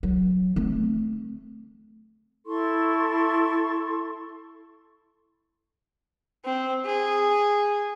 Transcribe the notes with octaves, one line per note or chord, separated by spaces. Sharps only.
F#3
A3 C4
E4 A4 C6 C#6
C4
G#4